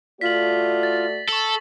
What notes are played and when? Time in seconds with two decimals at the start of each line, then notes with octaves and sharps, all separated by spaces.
0.21 A3 F4 F#4 D5 B6 F#7
0.83 A6
1.29 A4 C#6 F#7